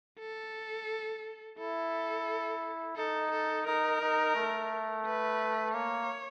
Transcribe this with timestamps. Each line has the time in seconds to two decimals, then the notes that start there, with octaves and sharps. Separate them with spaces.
0.20 A4
1.58 E4 A4
2.96 D#4 A4
3.32 A4
3.66 D#4 A#4
4.02 D#4
4.35 A3
5.06 B4
5.74 A#3 C#5